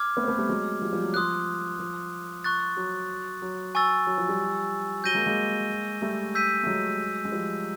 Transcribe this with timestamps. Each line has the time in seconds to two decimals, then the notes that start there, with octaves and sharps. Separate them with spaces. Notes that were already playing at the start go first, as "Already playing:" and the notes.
Already playing: D6 F6 G#6
0.17 A3 B3
0.24 C4
0.28 A3 B3
0.38 G3 A3
0.49 F#3 G#3
0.82 F3 G3
0.93 F3 G3
1.03 F#3
1.14 F3 C6 D#6 F#6
1.80 F3
2.44 C#6 F#6 A6
2.77 F#3
3.42 F#3
3.75 G#5 C#6 E6 A6
4.07 F#3
4.18 F3
4.28 F3 G3
5.04 F#3 G6 A#6 D#7 G7
5.15 G#3 A#3
5.26 G#3 A#3
6.02 G3 A3
6.35 E6 G6 B6 D#7
6.63 A3
6.67 F#3 G#3
7.25 G#3
7.32 F3 G3